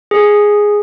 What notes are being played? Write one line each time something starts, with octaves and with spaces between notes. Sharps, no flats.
G#4